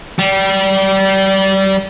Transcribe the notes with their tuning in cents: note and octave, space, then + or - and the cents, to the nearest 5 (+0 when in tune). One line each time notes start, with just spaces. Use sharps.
G3 -25